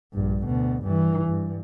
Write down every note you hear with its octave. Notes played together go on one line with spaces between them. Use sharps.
A#1 G2
D2 B2
G2 E3
G2